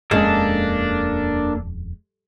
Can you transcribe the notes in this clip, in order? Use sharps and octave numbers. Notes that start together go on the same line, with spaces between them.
D#1 F2 G#3 A#3 C#4 D4 A4